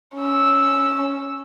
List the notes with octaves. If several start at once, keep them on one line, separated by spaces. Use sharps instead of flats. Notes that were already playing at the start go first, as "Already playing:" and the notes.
C#4 E6